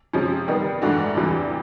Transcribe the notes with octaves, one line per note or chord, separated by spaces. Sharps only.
C3 F3 G#3 C#4
D#3 G3 B3
G#2 E3 A3 D4 F#4
E2 C3 E3 G3